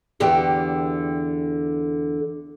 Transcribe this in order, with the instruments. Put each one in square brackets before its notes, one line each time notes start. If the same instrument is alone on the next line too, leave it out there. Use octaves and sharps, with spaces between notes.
[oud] E2 D3 G4